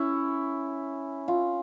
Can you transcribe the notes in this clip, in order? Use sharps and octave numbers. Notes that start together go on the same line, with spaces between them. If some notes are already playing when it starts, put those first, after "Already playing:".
Already playing: C#4 E4
F4